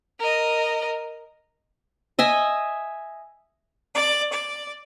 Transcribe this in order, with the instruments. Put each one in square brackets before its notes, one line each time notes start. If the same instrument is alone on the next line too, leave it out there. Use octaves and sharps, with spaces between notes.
[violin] A#4 D#5
[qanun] D#5 E5 G#5
[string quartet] D5
D5